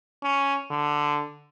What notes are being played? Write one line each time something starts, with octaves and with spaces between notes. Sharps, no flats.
C#4
D3